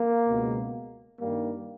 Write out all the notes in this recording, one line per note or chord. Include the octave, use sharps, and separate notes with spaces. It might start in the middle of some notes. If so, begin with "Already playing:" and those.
Already playing: A#3
C#2 B2 G#3
G2 D#3 G3 A#3